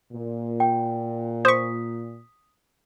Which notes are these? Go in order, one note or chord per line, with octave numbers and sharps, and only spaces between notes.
A#2
G5
C5 C#6 D#6 B6